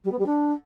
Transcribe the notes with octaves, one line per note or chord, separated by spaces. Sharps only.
G3
B3
G3
D4